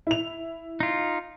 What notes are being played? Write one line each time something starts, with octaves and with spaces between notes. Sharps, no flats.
E4 F7
D#4 F4